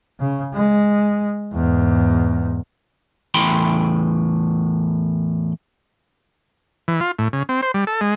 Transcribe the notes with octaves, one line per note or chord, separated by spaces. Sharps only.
C#3
G#3
E2 G#2
E2 A2 G5 B5 C6
E3
F4
A2
C#3
C4
C5
G3
A4
G#3